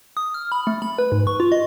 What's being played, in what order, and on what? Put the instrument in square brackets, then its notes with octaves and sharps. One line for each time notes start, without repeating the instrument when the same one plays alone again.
[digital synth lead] D#6
F6
B5
A3
B5
B4
G#2
C#6
F4
D#5